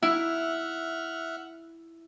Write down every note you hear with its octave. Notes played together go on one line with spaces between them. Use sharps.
E4 E5 F#5 F6